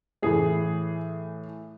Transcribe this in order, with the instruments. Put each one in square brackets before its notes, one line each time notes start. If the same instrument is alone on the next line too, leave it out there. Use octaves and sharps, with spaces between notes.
[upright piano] A2 E3 A3 G#4